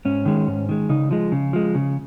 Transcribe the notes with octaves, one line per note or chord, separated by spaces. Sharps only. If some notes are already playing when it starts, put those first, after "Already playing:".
G#2 C#4
D#3 G#3
G#2
D#3 G#3
C#3 D#4
F3 G#3
C#3
F3 G#3
C#3